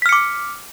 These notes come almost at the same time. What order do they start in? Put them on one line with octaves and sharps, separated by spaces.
B6 F6 C#7 D6